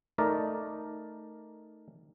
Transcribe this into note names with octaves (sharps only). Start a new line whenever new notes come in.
A3 D#4 A#4 D5